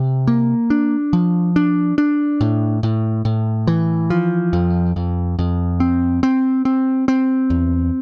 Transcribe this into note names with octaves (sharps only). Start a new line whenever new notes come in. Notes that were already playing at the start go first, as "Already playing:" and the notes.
Already playing: C3
A#3
D4
F3
D4
D4
A2
A2
A2
E3
F3
F2
F2
F2
C4
C4
C4
C4
E2